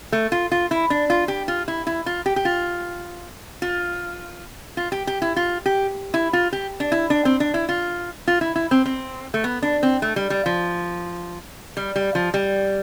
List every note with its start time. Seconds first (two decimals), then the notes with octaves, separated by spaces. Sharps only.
0.12 A3
0.32 F4
0.52 F4
0.71 E4
0.90 D4
1.10 F4
1.28 G4
1.48 F4
1.68 E4
1.87 E4
2.06 F4
2.26 G4
2.36 G4
2.45 F4
3.62 F4
4.77 F4
4.92 G4
5.07 G4
5.22 E4
5.36 F4
5.66 G4
6.14 E4
6.33 F4
6.53 G4
6.80 D4
6.92 E4
7.10 D4
7.25 C4
7.40 D4
7.54 E4
7.69 F4
8.28 F4
8.41 E4
8.56 E4
8.71 C4
8.85 C4
9.34 A3
9.44 B3
9.62 D4
9.83 C4
10.02 A3
10.16 G3
10.30 G3
10.46 F3
11.77 G3
11.96 G3
12.15 F3
12.34 G3